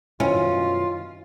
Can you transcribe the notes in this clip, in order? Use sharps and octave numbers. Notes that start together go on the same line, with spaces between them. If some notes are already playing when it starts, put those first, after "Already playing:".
F#2 B2 D#3 C#4 E4 F4